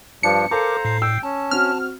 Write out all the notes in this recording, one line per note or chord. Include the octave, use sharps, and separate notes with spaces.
G2 F3 D4 C#7
A4 A#4 C5 F5 A5 A#5 D6
A2 C7
G5 E6
C#4 A5
C4 F#4 F6